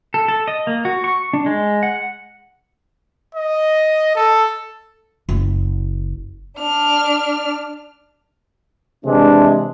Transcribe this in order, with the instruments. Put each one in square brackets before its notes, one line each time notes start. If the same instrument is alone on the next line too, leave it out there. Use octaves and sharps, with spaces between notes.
[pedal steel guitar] A4
A4
D#5
A#3
F#4
C#6
D4
G#3
F#5
[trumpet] D#5
A4
[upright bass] F#1
[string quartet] D4 F6
[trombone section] C3 E3 G#3 [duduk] D4